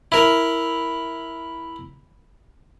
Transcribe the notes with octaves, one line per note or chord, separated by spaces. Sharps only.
E4 A#4